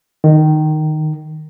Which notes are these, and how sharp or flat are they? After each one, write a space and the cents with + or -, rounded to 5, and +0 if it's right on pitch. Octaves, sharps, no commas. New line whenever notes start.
D#3 -10